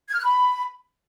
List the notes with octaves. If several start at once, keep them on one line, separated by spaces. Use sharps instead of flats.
G#6
F6
F#6
B5